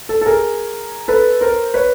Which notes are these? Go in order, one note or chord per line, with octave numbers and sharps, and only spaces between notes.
A4
A4
G#4 A#4
A4 B4
A#4 C5
B4 C#5